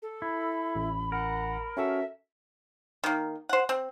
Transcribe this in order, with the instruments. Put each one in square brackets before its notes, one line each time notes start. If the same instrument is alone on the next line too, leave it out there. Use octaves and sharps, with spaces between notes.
[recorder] A4
[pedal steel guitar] E4 [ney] B5
[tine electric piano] A1
[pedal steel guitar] A#4 [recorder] F#5
[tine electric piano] C#4 F#4 A4 [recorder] E5
[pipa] D#3 A#3
C5 F#5
C4